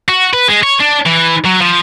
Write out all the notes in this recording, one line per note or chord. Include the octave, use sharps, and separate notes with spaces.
F#4
B4
G#3
C#5
D4
E3
F#3
F3